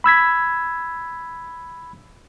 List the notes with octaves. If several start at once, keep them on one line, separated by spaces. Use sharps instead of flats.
B5 E6 G#6 B6